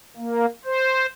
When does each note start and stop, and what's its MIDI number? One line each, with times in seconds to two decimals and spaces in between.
0.16 0.46 58
0.65 1.06 72